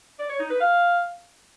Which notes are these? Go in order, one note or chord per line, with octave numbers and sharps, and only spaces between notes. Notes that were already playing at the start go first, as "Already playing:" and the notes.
D5
C#5
D#4
B4
F5